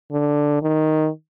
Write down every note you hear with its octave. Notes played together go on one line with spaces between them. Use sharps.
D3
D#3